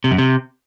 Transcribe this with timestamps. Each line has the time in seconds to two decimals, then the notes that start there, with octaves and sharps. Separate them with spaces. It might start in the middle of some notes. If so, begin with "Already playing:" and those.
0.04 C3
0.11 F#2
0.18 C3